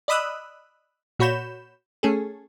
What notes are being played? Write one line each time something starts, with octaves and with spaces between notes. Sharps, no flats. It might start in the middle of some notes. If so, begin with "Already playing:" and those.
D5 D#5 B5 D#6 E6 F#6
A#2 F#4 C#5 B5 G6 E7
A3 C#4 G#4 A4